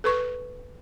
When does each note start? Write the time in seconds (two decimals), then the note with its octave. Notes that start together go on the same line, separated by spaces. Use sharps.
0.04 A4 B4 C#6